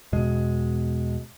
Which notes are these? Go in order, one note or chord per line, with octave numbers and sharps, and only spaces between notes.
E2 B2 G#3